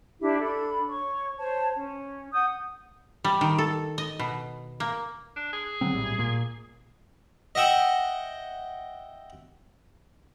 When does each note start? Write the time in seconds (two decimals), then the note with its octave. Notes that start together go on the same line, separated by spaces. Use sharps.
0.20 D4 E4 G4
0.40 D4 A4 B5
0.89 C#5 C#6
1.38 C5 C#5 A5
1.75 C#4
2.33 F#5 D#6 G6
3.24 G3
3.41 D#3
3.58 A4
3.98 D#5
4.20 B2
4.80 A#3
5.36 D4
5.53 G#4
5.81 D3 F#3 C4
5.92 A#1 A2 G3
6.18 A#2 A#3
7.55 D#5 E5 F#5 G5